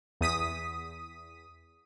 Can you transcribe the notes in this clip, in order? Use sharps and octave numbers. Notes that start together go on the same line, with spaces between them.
E2 D#6 B6 D#7